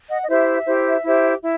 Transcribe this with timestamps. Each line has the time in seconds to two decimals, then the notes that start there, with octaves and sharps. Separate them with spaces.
0.10 D#5 F#5
0.23 D#5
0.29 E4 G4 C5 E5
0.67 E4 G4 C5
1.04 E4 G4 C5
1.42 E4